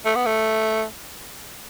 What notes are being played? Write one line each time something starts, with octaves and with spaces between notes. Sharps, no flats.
A3
B3
A3